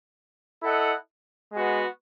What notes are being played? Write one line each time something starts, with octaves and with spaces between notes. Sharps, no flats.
E4 A4 D#5 F#5
G#3 B3 F#4